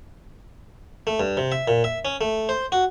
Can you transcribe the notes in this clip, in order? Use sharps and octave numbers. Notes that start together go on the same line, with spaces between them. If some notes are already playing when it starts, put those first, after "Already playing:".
A3
G2
C3
E5
A#2
E5
C#4
A3
C5
F#4